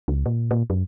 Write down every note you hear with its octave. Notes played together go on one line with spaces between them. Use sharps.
C#2
A#2
A#2
F#2